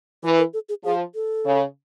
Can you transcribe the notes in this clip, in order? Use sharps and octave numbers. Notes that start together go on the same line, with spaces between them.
E3 B4
A#4
A4
G#4
F3 G#4
A4
C#3